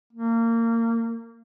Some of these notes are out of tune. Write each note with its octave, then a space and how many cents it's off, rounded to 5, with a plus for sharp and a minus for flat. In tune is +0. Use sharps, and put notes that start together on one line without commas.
A#3 -25